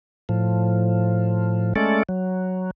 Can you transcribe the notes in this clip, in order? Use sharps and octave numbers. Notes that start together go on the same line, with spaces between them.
A2 F3
G#3 A3 C#4 A4 D5
F#3